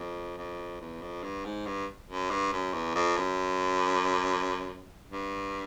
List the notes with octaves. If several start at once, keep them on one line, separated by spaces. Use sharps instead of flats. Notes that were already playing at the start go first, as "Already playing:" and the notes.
Already playing: F2
F2
E2
F2
G2
G#2
G2
F#2
G2
F#2
E2
F2
F#2
G2